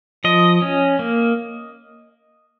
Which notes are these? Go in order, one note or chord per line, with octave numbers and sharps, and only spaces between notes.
F3 D#5
C#4
A#3